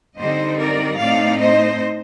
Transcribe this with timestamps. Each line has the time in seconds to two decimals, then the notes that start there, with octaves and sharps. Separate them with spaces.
0.17 D3 G3 C4 D#4 C5 D#5
0.58 A#4 D5
0.98 A2 A3 C4 D#4 D5 F5
1.38 C5 D#5